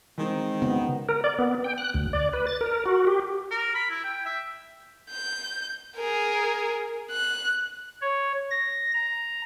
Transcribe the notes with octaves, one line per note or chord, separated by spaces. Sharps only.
D#3 E3 G#3 C4
C#3 B3
A#4
D5
B3
G5
F#6
D2
D5
B4
A6
A#4
F#4
G4
A#4
B5
E4
G5
E5
G6
G#4 A#4
F#6
C#5
A#6
A#5